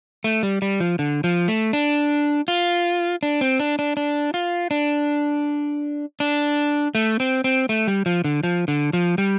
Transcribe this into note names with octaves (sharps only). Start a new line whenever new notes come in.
A3
G3
G3
F3
D3
F3
A3
D4
F4
D4
C4
D4
D4
D4
F4
D4
D4
A3
C4
C4
A3
G3
F3
D3
F3
D3
F3
G3